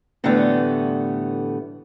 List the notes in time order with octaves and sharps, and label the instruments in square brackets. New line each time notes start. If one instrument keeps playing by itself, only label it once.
[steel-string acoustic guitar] A2 D3 E3 G3 A3 B3